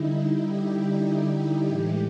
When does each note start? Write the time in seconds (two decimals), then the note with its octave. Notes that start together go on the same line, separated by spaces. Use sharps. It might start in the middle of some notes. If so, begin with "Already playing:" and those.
Already playing: D3 G3 D#4 E4
0.17 E4
0.47 G4
1.07 G4
1.68 A2 E3 G#3